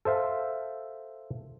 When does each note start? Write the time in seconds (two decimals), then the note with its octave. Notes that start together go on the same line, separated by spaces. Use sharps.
0.05 A4 C5 E5 F5